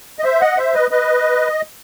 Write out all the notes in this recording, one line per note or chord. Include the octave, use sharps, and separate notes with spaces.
D#5
C5 E5
D#5 F#5
C5 E5
B4 D#5
B4 D#5